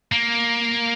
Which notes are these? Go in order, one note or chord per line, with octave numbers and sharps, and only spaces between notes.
A#3